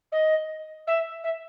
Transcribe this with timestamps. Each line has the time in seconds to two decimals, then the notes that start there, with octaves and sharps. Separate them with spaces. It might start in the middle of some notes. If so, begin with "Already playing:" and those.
0.12 D#5
0.87 E5
1.23 E5